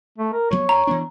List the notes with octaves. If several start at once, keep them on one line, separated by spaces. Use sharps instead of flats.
A3
A#4
G2 F#3 B3 C#5
G2 A#5
E3 B3 D4